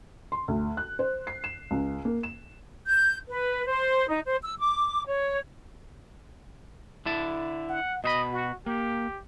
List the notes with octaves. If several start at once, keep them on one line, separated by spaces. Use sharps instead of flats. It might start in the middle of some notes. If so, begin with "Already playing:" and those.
C6
D2
F#6
C5
C7
E7
C#2
A#3
E7
G6
B4
C5
D#4
C5
E6
D6
C#5
D3 E4 A5
F#5
B2 C5 D#5 B5
F#4
A#3 G4